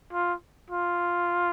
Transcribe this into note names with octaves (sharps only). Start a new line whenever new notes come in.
F4
F4